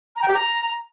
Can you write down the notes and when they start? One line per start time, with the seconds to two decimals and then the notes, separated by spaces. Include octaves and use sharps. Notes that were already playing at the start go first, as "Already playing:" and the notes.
0.16 A#5
0.22 G5
0.28 G4
0.34 A#5